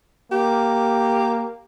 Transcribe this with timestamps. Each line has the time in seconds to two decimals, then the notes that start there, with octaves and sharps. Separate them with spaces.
0.32 A#3 G4